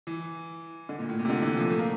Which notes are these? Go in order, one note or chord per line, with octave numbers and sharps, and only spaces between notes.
E3
D3
A#2
A2
A#2
C3
D3
E3
F3
A3
A#3